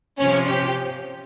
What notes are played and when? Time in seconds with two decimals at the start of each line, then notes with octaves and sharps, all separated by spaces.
0.18 C3 F3 C#4
0.48 G4